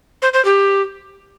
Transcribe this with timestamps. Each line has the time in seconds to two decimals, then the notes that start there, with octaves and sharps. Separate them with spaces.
0.22 C5
0.33 C5
0.45 G4